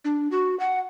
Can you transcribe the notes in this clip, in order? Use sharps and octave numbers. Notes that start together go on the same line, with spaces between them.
D4
F#4
F#5